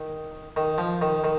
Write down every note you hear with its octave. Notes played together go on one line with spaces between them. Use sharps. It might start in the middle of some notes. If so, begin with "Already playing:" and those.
Already playing: D#3
D#3
F3
D#3
D#3